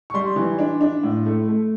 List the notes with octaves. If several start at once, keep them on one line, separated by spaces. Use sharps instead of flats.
C#6
G3 C6
E3
D4
D4
A2
A3
A3